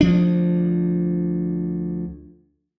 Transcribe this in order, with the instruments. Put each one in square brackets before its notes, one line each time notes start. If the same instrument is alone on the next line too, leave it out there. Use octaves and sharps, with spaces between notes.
[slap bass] D2 F3 D4